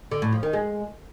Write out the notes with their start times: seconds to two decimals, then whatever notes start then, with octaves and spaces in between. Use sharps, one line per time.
0.11 D3
0.22 A2
0.32 F3
0.43 D#3
0.53 G#3